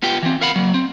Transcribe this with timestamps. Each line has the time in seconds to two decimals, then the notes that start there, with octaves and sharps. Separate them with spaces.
0.02 B3 F4 G4 G5
0.23 E3 C4
0.41 A#4 F5 F#5 B5
0.56 F#3 A#3
0.74 C4